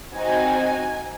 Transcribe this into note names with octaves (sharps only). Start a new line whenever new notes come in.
C4 D#4 F#4 G#5